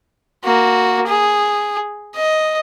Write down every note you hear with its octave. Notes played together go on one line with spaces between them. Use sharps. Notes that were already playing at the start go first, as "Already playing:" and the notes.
A#3 F#4
G#4
D#5